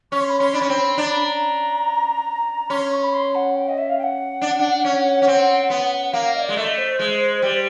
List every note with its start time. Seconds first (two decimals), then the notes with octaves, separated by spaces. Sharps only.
0.11 C#4 C#6
0.20 C6
0.29 B5
0.38 C#4 C6
0.53 D4 B5
0.61 C#4
0.69 C4
0.98 D4 A#5
1.11 B5
1.24 A#5
2.69 C#4 C6
2.91 C#6
3.03 B5
3.13 C6
3.35 F#5
3.55 G5
3.68 D#5
3.77 E5
3.89 F5
3.98 G5
4.03 F#5
4.42 D4
4.59 D4
4.85 C#4
5.22 C#4
5.28 C4
5.70 B3
6.13 A#3 F5
6.35 D#5
6.39 D5
6.49 G#3
6.56 A3 D#5 E5
6.77 C5
6.99 G#3
7.42 G3